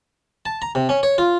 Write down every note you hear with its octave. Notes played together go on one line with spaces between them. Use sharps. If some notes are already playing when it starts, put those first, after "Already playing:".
A5
A#5
C3
C#4
C#5
F4